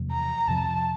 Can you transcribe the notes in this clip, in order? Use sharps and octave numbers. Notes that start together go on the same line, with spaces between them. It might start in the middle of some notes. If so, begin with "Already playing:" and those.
Already playing: E2 C3 F3 A3
A#5
F2 C3 F3 A5